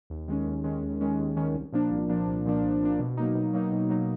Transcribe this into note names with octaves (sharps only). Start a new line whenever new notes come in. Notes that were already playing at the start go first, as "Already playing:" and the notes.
D#2
D#3 G#3 C#4
D#2
D#3 G#3 C#4
D#2
D#3 G#3 C#4
D#2
D#3 G#3 C#4
C2
A#2 F3 A#3 D4
C2
A#2 F3 A#3 D4
C2
A#2 F3 A#3 D4
C2
A#2 F3 A#3 D4
B2
F#3 A#3 D#4
B2
F#3 A#3 D#4
B2
F#3 A#3 D#4